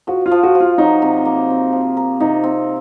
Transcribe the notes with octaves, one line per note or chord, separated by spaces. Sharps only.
F3 F#4
F4
F3
F#4
F3
F4
F#3 D#4
C3
A#3
C4
F3
A#4
C3 D#4
C4